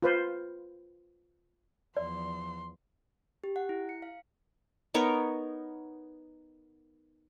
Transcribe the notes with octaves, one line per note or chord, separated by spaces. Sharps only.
F4 B4 C5
E2 F3 D5 C6
G4
F#5
E4
C#7
F5
B3 D#4 A#4 C#5